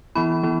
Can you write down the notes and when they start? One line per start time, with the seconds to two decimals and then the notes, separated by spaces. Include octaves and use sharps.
0.15 E3 B3 E4 B5
0.43 E3 B3 E4